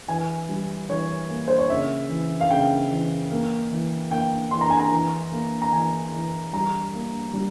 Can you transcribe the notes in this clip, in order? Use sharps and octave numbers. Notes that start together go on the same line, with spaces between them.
E3 G#5
G3
E3 C#5
A#3
C5
C#5
C#3 E5
E3
F5
C#3 G5
E3
A#3
E3
A#3 G5
E3 C6
A#5
G#5
A#5
E3
A#3
A#5
E3 G#5
E3
G3 A#5
A#3
G3